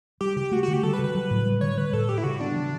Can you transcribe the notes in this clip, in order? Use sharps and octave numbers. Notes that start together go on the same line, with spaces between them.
G3 G4
C#3 G4
A3 F#4
D3 F#4
G4
G3 A4
B4
C#3
B4
F#3
A2
G3
D3 C#5
G3 B4
A2 A4
G3 G4
E4
C#3 F#4
B3 D4
E3